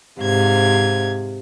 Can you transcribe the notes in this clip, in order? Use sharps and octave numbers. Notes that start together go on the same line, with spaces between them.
G#2 C3 F5 G#6